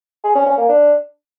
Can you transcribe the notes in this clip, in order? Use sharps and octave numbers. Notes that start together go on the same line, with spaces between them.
G#4
C#4
C#4
A#3
D4